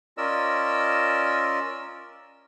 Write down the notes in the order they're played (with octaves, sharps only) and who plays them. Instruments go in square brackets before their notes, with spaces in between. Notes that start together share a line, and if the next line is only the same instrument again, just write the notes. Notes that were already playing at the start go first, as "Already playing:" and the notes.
[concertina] C#4 F4 A#4 D5 D#5 E6